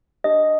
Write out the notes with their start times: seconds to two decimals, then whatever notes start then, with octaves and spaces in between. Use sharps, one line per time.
0.24 D4 G4 D#5